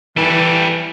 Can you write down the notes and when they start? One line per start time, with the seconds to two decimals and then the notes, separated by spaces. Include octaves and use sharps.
0.17 E3 G3 A4